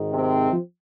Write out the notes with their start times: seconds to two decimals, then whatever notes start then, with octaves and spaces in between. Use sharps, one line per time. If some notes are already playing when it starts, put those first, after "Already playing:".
Already playing: G#1 G#2 D#3
0.12 C3 C4
0.51 F3